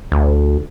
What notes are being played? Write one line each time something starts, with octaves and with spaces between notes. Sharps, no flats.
D2